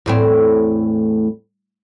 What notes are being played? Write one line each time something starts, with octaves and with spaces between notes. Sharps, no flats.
E2 A2 C4